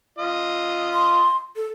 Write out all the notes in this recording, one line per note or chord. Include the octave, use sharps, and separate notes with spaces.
F4 D#5
C6
A4